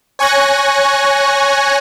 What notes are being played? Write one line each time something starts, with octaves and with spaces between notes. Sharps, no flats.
C#5 G#5 C#6 F#6 G#6 A#6